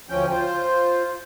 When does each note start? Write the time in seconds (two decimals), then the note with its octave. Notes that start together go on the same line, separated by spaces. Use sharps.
0.09 D2 F3 C#4 G5
0.31 F4 C5